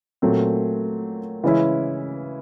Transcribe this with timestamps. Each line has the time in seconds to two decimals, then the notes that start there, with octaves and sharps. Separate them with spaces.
0.22 A#2 F#3 A3 C4
1.44 C#3 E3 G#3 C#4 E4